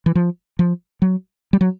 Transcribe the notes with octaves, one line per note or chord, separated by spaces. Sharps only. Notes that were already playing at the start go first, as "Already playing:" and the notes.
E3
F3
F3
F#3
G3
F#3